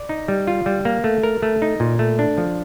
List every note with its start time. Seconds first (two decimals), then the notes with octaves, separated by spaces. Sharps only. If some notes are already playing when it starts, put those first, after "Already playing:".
Already playing: D5
0.09 D#4
0.28 G3
0.47 F4
0.66 G3
0.85 A#3
1.04 A3
1.23 A#4
1.42 A3
1.62 D#4
1.80 A#2
1.99 A3
2.19 D4
2.38 F3